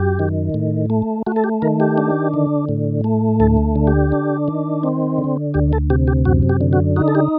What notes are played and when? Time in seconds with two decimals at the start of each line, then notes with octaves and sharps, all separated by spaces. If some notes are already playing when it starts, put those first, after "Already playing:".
Already playing: F#2 G4
0.19 D#3
0.54 A2
0.90 A3
1.26 A3 F#4
1.36 A4
1.44 G4
1.62 D#3 A#4
1.80 G4
1.98 D4
2.34 D3
2.69 A2
3.04 A3
3.40 D2 A4
3.76 D3
3.87 G4
4.12 D4
4.48 D#3
4.83 C4
5.18 D3
5.54 D2 G4
5.73 A4
5.90 C3 G4
6.08 G4
6.25 F#2 F#4
6.49 G4
6.61 D3
6.73 F#4
6.96 D#4 F#4
7.08 A4
7.15 G4